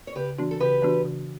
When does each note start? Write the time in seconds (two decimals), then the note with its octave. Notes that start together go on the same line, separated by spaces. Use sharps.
0.07 C#5
0.15 C#3 G4 B4
0.38 E3 B3 D4 F#4
0.51 A4
0.60 C#3 G4 B4
0.82 E3 B3 D4 F#4
1.05 C#3